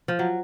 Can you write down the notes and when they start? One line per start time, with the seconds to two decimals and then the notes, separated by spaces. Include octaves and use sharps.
0.08 F3
0.19 F#3